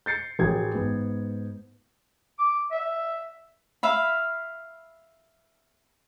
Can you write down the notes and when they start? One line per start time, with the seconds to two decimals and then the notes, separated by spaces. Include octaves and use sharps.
0.06 G6 A6 C7 C#7
0.39 A1 F#4 G#4 A#4 G5 G#6
0.73 G#2 B3
2.39 D6
2.71 E5
3.83 E5 F5 B5